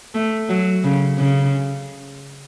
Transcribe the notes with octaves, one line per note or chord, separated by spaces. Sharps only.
A3
F#3
C#3
C#3